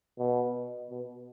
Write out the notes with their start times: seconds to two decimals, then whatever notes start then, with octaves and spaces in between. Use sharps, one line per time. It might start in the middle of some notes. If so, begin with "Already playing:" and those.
0.19 B2
0.90 B2